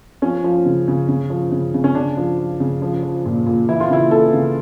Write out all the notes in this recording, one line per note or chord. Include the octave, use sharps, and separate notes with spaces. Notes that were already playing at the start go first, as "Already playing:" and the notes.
F3 C#4
F3
C#3
C#3
C#3
F3
C#3
C#3
C#4
C#3 D4
F3
F3
C#3
F3
F3
A#2
A#2
E3 E4
F4
C#3 E4
E3 A4
C#3